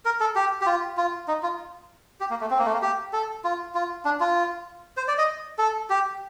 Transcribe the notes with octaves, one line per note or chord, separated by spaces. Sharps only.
A#4
A4
G4
G4
F4
F4
D#4
F4
G4
A#3
A3
C4
A#3
A3
A#3
G4
A4
F4
F4
D4
F4
C5
D5
D#5
A4
G4